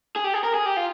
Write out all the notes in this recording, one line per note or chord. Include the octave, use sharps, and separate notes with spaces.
G#4
G4
G#4
A#4
G#4
G4
F4